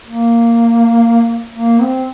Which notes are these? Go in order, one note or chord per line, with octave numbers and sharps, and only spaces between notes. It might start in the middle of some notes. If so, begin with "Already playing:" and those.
A#3
A#3
C4